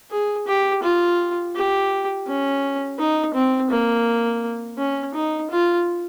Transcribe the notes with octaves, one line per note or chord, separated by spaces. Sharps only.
G#4
G4
F4
G4
C#4
D#4
C4
A#3
C#4
D#4
F4